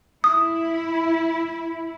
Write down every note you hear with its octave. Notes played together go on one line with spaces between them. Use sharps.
E4 D#6